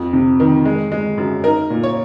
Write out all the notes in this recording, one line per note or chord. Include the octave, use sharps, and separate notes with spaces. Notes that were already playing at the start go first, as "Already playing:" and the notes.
Already playing: F2
C3
D#3
G#3
G#3
F#2
D#4 A#4
A#2
C#5